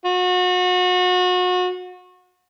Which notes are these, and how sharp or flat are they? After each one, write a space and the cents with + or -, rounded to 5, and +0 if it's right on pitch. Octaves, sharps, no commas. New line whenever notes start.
F#4 -35